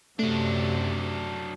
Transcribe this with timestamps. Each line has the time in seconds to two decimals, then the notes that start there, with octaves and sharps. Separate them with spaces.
0.19 F#2 C3 F#3 A3 D4